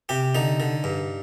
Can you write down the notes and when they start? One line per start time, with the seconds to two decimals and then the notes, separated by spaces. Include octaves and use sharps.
0.09 C3 G4
0.35 D3 D#4
0.60 D3
0.84 G2